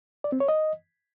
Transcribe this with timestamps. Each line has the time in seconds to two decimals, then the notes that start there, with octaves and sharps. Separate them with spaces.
0.24 D5
0.32 C4
0.40 C#5
0.48 D#5